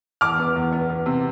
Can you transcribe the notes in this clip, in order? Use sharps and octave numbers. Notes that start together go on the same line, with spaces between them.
E2 D6 F6
B3
E2
B3
B3
C3